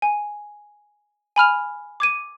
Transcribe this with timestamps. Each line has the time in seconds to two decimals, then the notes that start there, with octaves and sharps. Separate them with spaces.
0.02 G#5
1.36 G#5 B5 F6 F7
2.00 D6 G#6 D#7